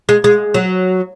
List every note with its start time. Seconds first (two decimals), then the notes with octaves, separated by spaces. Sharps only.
0.09 G#3
0.24 G#3
0.54 F#3